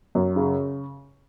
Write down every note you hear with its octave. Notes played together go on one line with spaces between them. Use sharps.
F#2
C#3